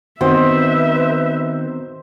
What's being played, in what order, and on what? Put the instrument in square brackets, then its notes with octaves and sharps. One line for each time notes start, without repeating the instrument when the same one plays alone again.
[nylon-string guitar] D#3 [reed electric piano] B3 C4 F#4 [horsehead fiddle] B4 E5 [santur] C5